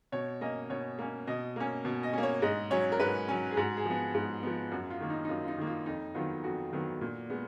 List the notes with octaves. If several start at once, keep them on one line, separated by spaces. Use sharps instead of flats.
B2 C#5
A#3 C#4 D#5
B2 C#5
A#3 C#4
B2 D#5
A#3 C#4
B2
D#5
A#3 C#4
C#5
G#2 D#5
F#3 C#4 C#5
A#4
G#2 B4
F#3 C#4
G#4
G#2 F#4
G#4
F3 B3
G#2
F3 B3
F#2 F#4
F4
D#3 A#3
D#4
D#4
F#2 F4
F4
D#4
D#3 A#3
F4
F2 D#4
D#3 F#3 B3 F4
F2 F#4
D#3 F#3 B3
A#2
G#3 B3